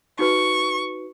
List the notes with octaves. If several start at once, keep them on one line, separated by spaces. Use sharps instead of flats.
D#4 F#4 B4 C#6